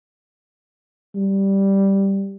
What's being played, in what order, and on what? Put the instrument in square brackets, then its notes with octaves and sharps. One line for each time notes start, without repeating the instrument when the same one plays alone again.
[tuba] G3